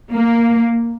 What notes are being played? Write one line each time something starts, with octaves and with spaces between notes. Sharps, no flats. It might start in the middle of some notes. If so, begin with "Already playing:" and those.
A#3